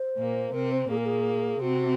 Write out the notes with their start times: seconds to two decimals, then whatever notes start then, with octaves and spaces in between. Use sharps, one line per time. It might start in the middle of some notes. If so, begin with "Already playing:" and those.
Already playing: C5
0.18 A#2 A#3
0.53 C3 C4 A#4
0.72 C5
0.90 A#2 A#3 G#4
0.97 A#4
1.06 G#4
1.61 C3 C4 F#4